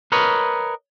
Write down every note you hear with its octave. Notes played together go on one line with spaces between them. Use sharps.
A#4 B4 C#5 D#5